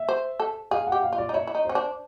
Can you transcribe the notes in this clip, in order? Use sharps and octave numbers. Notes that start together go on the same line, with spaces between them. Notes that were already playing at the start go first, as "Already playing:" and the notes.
Already playing: E5
C5
A4
G#4 F5
F#5
G4
F5
F4
D5
D#4
E4 C#5
E4
D#4
C#4 C5
D4